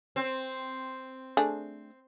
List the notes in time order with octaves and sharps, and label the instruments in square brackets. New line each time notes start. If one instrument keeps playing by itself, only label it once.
[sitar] C4
[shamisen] A3 D4 G#4